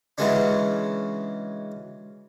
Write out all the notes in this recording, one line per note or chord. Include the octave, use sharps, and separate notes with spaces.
C#3 E3 F#3 G#3 C#4 D4